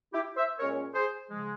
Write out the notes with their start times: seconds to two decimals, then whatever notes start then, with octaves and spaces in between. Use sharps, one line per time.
0.13 E4 G4
0.36 C5 E5
0.59 A#2 G#3 C#4 A#4 C#5
0.94 G#4 C5
1.30 C#3 F3 G#3